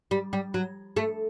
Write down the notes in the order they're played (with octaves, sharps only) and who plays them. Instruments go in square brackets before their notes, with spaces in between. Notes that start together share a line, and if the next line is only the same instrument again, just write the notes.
[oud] G3
G3
F#3
A3